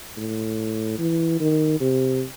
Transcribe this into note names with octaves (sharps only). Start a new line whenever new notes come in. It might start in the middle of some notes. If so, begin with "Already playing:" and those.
A2
E3
D#3
C3